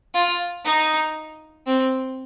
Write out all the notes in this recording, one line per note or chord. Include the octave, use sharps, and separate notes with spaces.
F4
D#4
C4